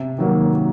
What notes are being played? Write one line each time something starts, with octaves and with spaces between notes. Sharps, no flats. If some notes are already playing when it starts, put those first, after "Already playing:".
Already playing: C3
D#3 F#3 A#3